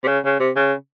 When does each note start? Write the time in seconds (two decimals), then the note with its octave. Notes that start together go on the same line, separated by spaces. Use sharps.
0.04 C3
0.07 C#3
0.24 C#3
0.40 C3
0.56 C#3